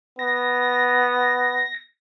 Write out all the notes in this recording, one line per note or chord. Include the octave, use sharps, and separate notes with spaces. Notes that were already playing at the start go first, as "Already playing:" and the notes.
B3 A#6